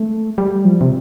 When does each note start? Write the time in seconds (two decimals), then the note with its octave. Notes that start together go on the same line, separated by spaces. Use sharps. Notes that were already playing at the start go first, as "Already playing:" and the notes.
Already playing: A3
0.38 G3
0.65 F3
0.81 C3